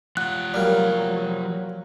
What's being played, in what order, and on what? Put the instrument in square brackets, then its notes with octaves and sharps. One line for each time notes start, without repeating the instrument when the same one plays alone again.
[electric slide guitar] F3 F4 F#5 [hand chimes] F#6
[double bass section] F#3 [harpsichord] G3 A#3